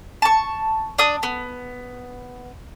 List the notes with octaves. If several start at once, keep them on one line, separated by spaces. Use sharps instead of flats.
A5 C#6
D4 D#6
B3